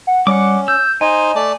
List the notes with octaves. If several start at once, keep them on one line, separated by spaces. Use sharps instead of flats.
F#5
G3 C#4 F#5 D6
E6 G6
D#4 C5 D#5 G#5
A3 D5 A5